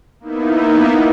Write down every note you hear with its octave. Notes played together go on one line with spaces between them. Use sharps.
A#3 B3 D#4 E4